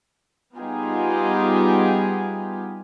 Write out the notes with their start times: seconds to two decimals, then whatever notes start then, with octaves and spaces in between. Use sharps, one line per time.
0.58 G3 B3 D#4 F4 G4 G#4